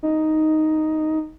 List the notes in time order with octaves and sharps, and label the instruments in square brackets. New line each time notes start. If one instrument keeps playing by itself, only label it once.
[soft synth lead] D#4